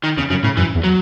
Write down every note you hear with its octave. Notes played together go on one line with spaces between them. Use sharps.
D#3
E2 C#3
F#2 C#3
A2 C#3
F#2 E3
E2
F#3